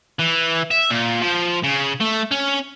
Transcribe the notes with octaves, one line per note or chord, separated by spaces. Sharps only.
E3
E5
A#2
F3
C#3
A3
C#4